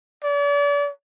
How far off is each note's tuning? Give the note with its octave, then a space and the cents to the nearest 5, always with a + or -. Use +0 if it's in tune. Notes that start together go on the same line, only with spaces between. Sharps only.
D5 -40